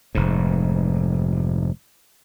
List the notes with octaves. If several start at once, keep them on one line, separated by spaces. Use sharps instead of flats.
F1 G#2